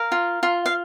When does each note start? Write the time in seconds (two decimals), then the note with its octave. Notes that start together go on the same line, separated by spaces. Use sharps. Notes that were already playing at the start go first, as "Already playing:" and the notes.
Already playing: A#4 F5
0.12 F4
0.43 F4
0.66 F5